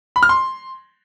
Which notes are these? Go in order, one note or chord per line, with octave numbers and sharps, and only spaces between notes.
B5
F6
C6